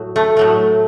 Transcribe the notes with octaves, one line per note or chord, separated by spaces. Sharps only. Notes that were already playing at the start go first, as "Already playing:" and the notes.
Already playing: A2 F#3
A3
A2 F#3 A3